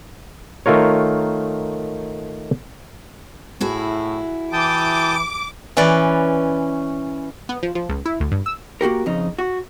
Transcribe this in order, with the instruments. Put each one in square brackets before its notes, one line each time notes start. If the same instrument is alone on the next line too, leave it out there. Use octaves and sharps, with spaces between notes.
[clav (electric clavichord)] D#3 A3 F4 A#4 C#5
[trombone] A2 [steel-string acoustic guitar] E4 F#4 G#4
[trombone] E3 [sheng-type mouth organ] G5 A5 D#6 [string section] D6
[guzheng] E3 C#4 B4 D5
[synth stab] B3
F3
F3
C#2
E4
D2
G2
E6
[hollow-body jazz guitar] A#3 F#4 G4 A#4
F2 C#3 D#4
F#4